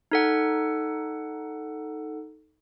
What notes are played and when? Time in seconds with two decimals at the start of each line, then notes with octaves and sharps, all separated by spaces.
0.11 D#4 A4 F#5